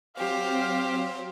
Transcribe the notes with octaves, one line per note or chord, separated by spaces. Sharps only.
F#3 C4 G4 C5 F5